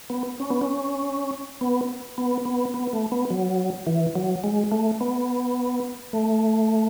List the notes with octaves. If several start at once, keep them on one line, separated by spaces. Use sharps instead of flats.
B3
C#4
B3
C#4
B3
B3
B3
B3
A3
B3
F#3
E3
F#3
G#3
A3
B3
A3